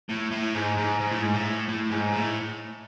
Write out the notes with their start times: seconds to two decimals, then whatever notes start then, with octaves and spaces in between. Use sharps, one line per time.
0.09 A2
0.31 A2
0.54 G#2
0.77 G#2
1.00 G#2
1.11 A2
1.21 G#2
1.34 A2
1.69 A2
1.91 G#2
2.14 A2